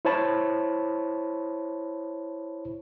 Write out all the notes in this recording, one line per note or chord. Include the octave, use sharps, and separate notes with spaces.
E4 C5 C#5 A5 B5